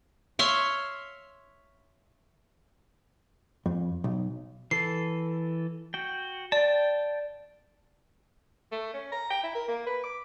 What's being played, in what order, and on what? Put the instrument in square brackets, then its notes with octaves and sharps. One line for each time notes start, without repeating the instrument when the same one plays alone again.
[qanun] C#5 E5 F5 C6
[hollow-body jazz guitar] F2
B1
[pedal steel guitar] E3 A4 [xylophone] C7
[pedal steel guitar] F#4 G5
[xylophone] D5 [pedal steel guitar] G5 A5
[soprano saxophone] A3
C#4
A#5
G5
E4
A#4
A#3
B4
D6